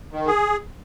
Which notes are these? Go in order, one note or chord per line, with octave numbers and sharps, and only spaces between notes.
D#3
G#4